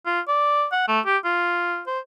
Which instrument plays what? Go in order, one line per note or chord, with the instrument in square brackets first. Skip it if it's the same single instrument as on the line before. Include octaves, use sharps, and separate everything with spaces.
[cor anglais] F4
D5
F#5
A3
G4
F4
C5